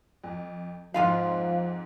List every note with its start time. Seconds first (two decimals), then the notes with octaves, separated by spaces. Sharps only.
0.24 F2
0.94 F2 G#2 F3 G#3 F4 F5